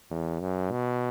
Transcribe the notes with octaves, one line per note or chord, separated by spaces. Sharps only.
E2
F#2
B2